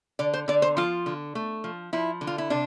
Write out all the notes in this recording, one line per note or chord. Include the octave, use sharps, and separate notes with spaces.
D3 D5
C5
D3 D5
C5
F3 F4
D3
A3
F3
F3 E4
D3
F4
E4
C3 D4